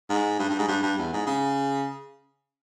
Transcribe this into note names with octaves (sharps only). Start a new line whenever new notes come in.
G#2
G2
G2
G#2
G2
G2
E2
G#2
C#3